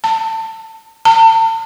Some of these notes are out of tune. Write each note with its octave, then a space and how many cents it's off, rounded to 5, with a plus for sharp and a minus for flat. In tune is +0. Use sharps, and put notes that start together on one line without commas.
A5 +20
A5 +40